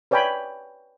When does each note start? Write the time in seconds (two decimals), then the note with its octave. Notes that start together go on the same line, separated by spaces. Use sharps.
0.11 B4 C#5 D5 G5 G#5 B5